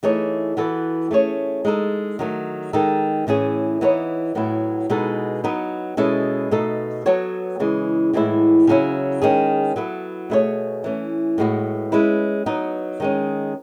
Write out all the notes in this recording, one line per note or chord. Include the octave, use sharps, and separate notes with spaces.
E3 A3 D#4 G#4 C#5
E3 B3 F#4 A4
A3 C#4 G#4 C#5
G#3 D#4 A4
D#3 F#3 A3
D#3 G#3 D#4 A4
A2 E3 A3 C#4 G#4
E3 B3 D#4 A4 C#5
A2 F#3 B3 E4
B2 G#3 B3 D#4 A4
F#3 B3 D#4
B2 G#3 C#4 E4 A4
B2 A3 D#4 A4
F#3 B3 F#4 A4 C#5
C#3 E3 G#3
A2 E3 G#3 B3 E4
C#3 F#3 C#4 E4
D#3 G#3 C#4 G#4
F#3 B3 E4 A4
B2 A3 E4 G#4 C#5
E3 A3 C#4
A2 G#3 B3 F#4
G#3 C#4 E4 B4
F#3 B3 D#4
D#3 G#3 C#4